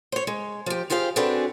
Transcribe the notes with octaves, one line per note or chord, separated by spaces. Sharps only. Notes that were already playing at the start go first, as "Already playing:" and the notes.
C5 C#5
G#3
F3 G4
F4 G4 G#4 C5 F5
C4 D4 F#4 G#4 A4 B4